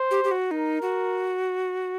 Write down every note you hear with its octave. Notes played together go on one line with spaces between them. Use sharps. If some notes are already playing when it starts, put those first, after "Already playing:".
Already playing: C5
G4
G4
F#4
D#4 A#4
F#4